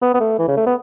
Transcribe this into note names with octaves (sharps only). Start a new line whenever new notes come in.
B3
B3
A3
E3
C#3
A3
B3